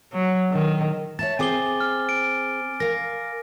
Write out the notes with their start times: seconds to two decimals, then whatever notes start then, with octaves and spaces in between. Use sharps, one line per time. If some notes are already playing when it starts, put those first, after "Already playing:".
0.13 F#3
0.52 D#3
1.19 C#5 E5 A5 A6
1.39 C4 G#4 C5 G#5 D6 G7
1.80 F6
2.09 D7
2.80 A#4 F5 A#6